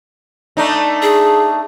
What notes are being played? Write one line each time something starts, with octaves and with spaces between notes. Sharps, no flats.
A3 D4 D#4
G#4